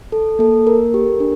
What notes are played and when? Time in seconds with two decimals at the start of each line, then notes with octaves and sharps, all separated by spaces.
0.12 A4
0.39 A#3 A4
0.66 A#3 A#4
0.94 G4
1.20 D4